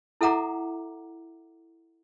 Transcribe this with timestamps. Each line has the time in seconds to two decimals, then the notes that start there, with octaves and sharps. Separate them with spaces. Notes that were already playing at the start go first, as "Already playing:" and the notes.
0.21 E4 A4 E5 F#5 A#5 D6